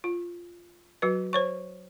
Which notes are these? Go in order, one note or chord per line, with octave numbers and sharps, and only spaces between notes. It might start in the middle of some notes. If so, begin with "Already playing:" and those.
F4
F#3 F#4 B4
C5 C#5 C#6